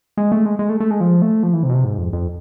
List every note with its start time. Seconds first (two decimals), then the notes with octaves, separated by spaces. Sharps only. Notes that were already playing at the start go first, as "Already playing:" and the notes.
0.17 G#3
0.32 A3
0.46 G#3
0.59 G#3
0.69 A3
0.80 A3
0.91 G#3
1.00 F3
1.22 A3
1.43 F3
1.53 E3
1.63 C3
1.69 B2
1.74 C3
1.84 G#2
1.98 F2
2.13 F2